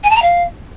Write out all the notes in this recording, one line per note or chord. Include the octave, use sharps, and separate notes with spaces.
G#5
A5
A#5
F5